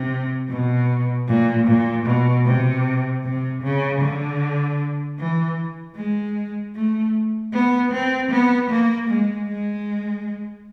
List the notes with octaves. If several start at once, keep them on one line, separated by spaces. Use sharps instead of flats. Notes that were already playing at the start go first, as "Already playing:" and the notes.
Already playing: C3
B2
A#2
A#2
B2
C3
C3
C#3
D3
E3
G#3
A3
B3
C4
B3
A#3
G#3
G#3